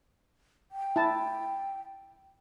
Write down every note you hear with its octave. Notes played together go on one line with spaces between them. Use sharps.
G5
E4 A5